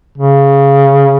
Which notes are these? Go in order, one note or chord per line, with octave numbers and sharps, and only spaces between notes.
C#3